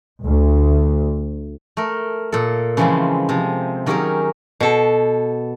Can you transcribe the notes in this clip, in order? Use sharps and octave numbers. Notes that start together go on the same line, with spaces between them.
D2
A3 A#4
A#2 A4
C#3 E3 F3 G#3 A3 C4
C3 F3
D#3 F#3 C#4 G4 G#4 A#4
B2 A4